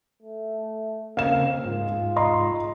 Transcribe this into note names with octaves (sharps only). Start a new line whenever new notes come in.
A3
C#3 A#3 C4 F5 E7
G#2 F4
D#5 A#5 C6